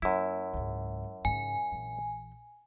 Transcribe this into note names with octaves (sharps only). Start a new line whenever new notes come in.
F#2 A#3 E4
C#2 G#2
G#2 C#3 G#5
A#1 E3